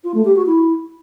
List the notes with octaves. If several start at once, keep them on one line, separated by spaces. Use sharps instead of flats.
F4
A3
G4
F#4
E4